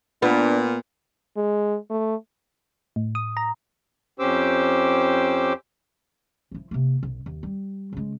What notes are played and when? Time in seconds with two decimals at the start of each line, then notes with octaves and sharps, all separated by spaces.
0.22 A#2 B3 D4
1.37 G#3
1.90 A3
2.96 A2
3.15 D#6
3.37 A#5
4.20 F2 C#4 G4 C5 D6 E6
6.51 F3 E4
6.71 C3 A#3
7.03 B1
7.26 D#2
7.43 G3
7.93 C#3 G#3